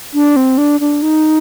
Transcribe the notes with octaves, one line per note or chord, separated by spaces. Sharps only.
D4
C4
D4
D4
D#4